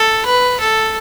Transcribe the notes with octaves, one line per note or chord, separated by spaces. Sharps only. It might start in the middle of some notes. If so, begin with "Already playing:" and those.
Already playing: A4
B4
A4